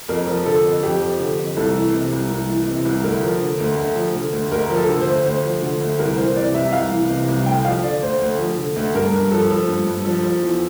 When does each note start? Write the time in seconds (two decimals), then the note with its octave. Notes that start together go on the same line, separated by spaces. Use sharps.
0.09 F2 A#4
0.27 F3
0.45 D3 A4
0.64 F2
0.83 F2 G4
1.00 F3
1.19 D3
1.38 F2
1.57 C2 A4
1.74 E3
1.93 C3
2.12 C2
2.31 C2
2.49 E3
2.68 C3
2.85 C2
3.03 D2 A#4
3.23 F3
3.42 D3
3.60 D2
3.77 D2
3.96 F3
4.15 D3
4.33 D2
4.51 D2 A#4
4.70 F3
4.77 A4
4.89 D3
5.01 C5
5.06 D2
5.26 D2 C5
5.44 F3
5.62 D3
5.81 D2
5.99 C2 A#4
6.17 E3 C5
6.36 C3 D5
6.54 C2 E5
6.72 C2 F5
6.91 E3
7.10 C3
7.28 C2
7.46 D2 G5
7.65 F3 F5
7.83 D3 D5
8.02 D2 C5
8.21 D2
8.39 F3
8.58 D3
8.76 D2
8.95 G2 A#4
9.12 G2
9.31 F3 A4
9.50 F3
9.68 G2
9.86 G2
10.05 F3
10.23 F3
10.43 E2